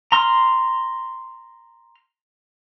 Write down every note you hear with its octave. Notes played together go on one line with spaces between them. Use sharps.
A#5 C6 F6